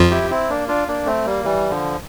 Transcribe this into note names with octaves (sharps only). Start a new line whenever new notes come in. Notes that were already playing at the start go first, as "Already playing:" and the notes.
Already playing: F2 F3
E4 G4
C4 E4
A#3 D4
D4 F4
A#3 D4
A3 C4
G3 A#3
E3 G3
D3 F3